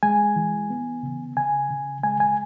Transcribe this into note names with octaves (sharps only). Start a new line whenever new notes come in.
G#3 G#5
E3
B3
C#3
C#3 G#5
C#3
G#3 G#5
G#5